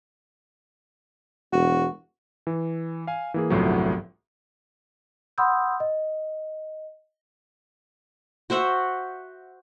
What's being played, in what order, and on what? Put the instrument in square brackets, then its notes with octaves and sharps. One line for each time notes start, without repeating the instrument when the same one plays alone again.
[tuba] E1 [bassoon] F#4
[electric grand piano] E3
F5 G#5
E3 A#3 G#4
G1 C2 A2 F3 F#3
[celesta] F#5 B5 C6 D#6 E6 G6
D#5
[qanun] F#4 C5 E5 F#5